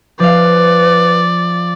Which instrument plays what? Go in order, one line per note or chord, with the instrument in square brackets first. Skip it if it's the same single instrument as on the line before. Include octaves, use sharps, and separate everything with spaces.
[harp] F3 F5 [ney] B4 [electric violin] D5